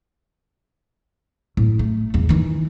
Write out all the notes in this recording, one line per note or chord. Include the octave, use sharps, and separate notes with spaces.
A2
A3
E2 C#3
D#3 E3